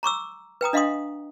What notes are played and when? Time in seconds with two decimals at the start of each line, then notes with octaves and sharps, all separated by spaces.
0.03 A#5 C#6 D6 E6
0.61 B4 G5 A#5 D#6
0.73 D4 D#5 F5 F#5 C6 D#6